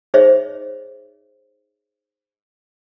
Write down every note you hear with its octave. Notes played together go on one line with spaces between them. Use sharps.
D#4 G#4 C5 C#5 D#5 E5